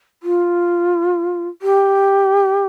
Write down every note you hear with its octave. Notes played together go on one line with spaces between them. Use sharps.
F4
G4